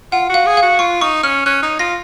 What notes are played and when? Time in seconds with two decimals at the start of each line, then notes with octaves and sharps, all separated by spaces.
0.12 F4 F#5
0.30 F#4 F5
0.46 G#4
0.57 F5
0.62 F#4
0.79 F4 C#6
1.01 D#4 C#6
1.23 C#4 F6
1.46 C#4 F#6
1.63 D#4
1.79 F4 A#6